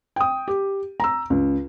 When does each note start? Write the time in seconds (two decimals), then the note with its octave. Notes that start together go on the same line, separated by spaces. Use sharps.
0.16 G5 D#6
0.48 G4
1.00 A#5 E6
1.30 C#2